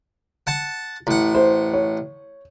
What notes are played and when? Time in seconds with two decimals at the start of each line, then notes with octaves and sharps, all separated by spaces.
0.47 F#5 A5
1.07 A1 F#5
1.35 C5
1.73 C#5